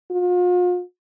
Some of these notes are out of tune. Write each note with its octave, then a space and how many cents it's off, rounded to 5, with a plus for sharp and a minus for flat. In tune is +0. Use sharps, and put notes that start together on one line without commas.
F4 +40